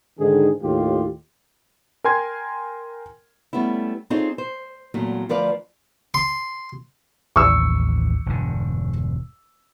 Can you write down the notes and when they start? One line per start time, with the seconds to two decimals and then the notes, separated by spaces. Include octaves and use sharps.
0.20 G#2 D3 D#3 G#4
0.63 D#2 A2 F4 G4
2.04 A#4 G5 G#5 C6 G#6
3.53 G3 A3 B3 C#4 E4
4.10 C4 D#4 F4 G#4 A4 C#5
4.38 C5
4.94 E2 A#2 F#3 A3
5.29 D2 F3 A#4 B4 D5 F5
6.14 C6
7.36 A1 D#2 C#6 E6
8.26 E1 G2 D3